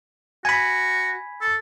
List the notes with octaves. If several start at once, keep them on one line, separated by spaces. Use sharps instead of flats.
F#4 G#5 B5
A4